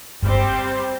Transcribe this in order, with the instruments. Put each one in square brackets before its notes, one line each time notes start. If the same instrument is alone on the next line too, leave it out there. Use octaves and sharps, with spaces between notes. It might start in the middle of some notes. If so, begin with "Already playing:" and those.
[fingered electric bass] G1 G2 [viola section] G3 C4 G4 C5